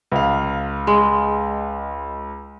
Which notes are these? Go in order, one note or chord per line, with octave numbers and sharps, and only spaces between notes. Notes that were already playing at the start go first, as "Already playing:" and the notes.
C#2 F5
G#3